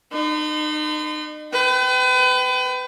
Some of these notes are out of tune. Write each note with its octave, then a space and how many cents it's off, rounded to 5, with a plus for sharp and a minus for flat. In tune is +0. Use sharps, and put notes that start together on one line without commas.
D#4 -35 C6 -45
B4 +35 G5 -20